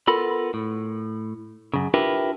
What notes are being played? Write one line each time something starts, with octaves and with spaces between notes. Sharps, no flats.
B3 F4 A4 A#4 B5
A2
F#2 C#3
D4 E4 F4 G4 A#4 B4